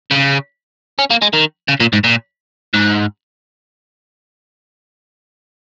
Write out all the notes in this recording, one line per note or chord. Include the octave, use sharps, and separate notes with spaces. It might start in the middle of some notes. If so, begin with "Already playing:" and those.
C#3
C#4
A#3
G#3
D#3
C#3
A#2
G#2
A#2
G#2